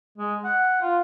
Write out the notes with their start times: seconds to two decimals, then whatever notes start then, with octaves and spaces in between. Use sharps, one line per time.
0.18 G#3
0.44 F#5
0.82 F4